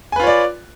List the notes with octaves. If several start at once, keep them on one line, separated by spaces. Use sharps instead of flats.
F4 B4 C#5 D5 G#5